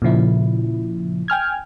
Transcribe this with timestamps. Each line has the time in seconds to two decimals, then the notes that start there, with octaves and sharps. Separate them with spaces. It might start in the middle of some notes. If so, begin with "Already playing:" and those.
0.02 A#2 C#3 F3 E4
1.28 G5 G#5 F6 G#6